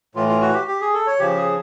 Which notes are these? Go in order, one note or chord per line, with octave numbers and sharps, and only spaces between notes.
A2 E3 F4
F4
F#4
G4
G4
G#4
A4
C#5
C#3 F3 G4
G#4